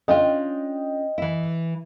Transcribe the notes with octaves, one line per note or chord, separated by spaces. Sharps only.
C#4 D4 F4 D#5 G5
E3 E4